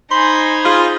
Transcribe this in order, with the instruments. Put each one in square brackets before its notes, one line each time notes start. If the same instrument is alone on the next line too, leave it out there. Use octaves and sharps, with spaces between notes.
[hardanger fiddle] D#4 G#5 [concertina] C5 B5 [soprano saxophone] C6
[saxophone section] F4 G#4 [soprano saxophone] C6